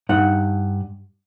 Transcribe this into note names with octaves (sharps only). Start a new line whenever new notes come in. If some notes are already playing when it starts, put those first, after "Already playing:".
G2 D#4 F#5